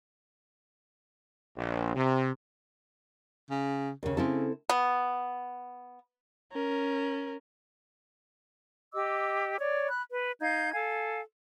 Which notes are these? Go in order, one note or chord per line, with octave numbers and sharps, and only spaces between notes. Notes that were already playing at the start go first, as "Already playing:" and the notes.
A#1
C3
C#3
D#2 C#3
C#3 C4 E4 A4
B3
C#4 A#4
G4 D#5 D6 E6
C#5 D5
B5 F#6
B4
D#4 F5 G6 G#6
A4 F5 G#5